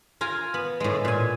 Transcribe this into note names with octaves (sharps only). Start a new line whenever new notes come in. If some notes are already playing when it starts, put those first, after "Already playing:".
F4 A#4 G#5 A#5
B3
A2 G#3
A#2 G#5